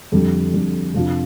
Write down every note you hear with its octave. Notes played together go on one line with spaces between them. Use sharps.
F2 D3 G3
F2 D3 G3
F2 C3 F3 D4 F4